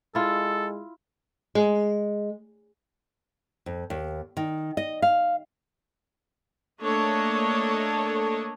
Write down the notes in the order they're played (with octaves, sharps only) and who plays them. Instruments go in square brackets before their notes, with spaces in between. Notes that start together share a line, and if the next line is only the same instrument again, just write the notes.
[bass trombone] G#3 [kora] E4 F4 [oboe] A4
[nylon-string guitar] G#3
F2
D#2
D#3
D#5
F5
[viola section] A3 A#3 D4 A4 C#5 D#5